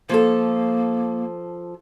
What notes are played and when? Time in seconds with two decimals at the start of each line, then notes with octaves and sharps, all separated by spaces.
0.09 F3 A#3 A4